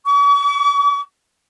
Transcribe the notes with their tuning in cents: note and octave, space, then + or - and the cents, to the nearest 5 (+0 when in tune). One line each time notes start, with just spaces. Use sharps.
C#6 +45